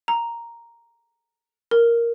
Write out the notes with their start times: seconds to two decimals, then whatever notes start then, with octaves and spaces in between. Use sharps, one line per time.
0.08 A#5
1.71 A#4